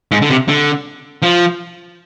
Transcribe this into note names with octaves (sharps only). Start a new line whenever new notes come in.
G#2
D3
C3
D3
F3